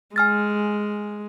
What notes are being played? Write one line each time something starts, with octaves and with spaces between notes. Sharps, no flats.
G#3 G#5 F6 A6